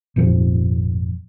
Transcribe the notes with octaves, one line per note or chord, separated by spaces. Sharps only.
G#1 F2 A#2 F3